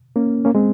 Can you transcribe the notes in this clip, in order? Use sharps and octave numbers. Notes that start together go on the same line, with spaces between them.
A#3 C#4
A#3 C#4
G#3 C4